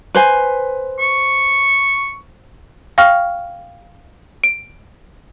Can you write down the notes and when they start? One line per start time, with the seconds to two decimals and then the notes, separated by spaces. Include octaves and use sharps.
0.15 B4 C5 G#5
1.00 C#6
2.98 F5 G5 C#6 F6
4.44 D7